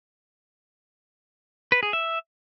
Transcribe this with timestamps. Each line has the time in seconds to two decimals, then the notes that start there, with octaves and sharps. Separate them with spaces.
1.72 B4
1.83 G#4
1.93 E5